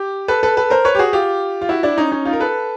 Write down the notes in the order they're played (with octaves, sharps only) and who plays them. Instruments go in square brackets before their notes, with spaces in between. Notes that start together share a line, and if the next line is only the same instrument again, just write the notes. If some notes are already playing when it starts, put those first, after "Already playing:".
Already playing: [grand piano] G4
A4 B4
A4 B4
A4 B4
A#4 C5
B4 C#5
G4
F#4 G#4
F4 G4
F4
E4 F#4
D4 E4
C#4 D#4
C#4 D#4
D#4 F4
A#4
A4 B4